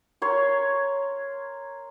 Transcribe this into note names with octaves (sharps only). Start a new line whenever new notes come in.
A#4 C#5 C6